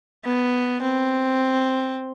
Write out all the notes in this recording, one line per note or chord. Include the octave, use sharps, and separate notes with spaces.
B3
C4